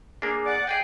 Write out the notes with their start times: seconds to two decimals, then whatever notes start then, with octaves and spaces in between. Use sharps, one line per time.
0.22 A#3 D4 G#4
0.45 D5 F#5
0.67 G#4 D5 D#5 G5 C7